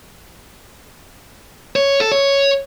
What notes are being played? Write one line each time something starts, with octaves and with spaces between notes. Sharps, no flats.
C#5
A4
C#5